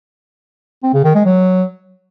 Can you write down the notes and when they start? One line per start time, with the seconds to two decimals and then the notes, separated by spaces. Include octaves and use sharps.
0.83 C4
0.94 C#3
1.04 D#3
1.15 G#3
1.25 F#3